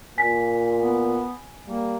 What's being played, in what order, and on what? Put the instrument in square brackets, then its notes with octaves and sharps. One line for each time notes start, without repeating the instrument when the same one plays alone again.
[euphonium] A#2 [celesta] G#5 B6
[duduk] B3
[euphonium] G3 [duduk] A#3